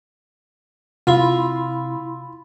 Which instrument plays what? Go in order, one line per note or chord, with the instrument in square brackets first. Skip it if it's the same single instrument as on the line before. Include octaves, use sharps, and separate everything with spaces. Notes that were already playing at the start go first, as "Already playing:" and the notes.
[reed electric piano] C3 [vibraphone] E4 B5 C6 [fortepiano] F4